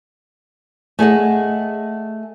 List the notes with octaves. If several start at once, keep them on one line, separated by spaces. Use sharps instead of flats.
A3 G#4 D#5 F#5